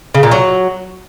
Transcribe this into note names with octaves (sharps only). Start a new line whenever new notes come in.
C#3
A#2
F#3